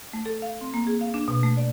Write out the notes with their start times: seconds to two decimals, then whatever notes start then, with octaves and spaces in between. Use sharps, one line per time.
0.13 A3
0.26 A4
0.42 F5
0.61 C4
0.74 A#3
0.87 G#4
1.01 F5
1.14 D4
1.28 B2
1.43 A3
1.57 D5